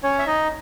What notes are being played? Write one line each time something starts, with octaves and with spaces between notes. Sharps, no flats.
C#4 C#5
E5
D#4 D#5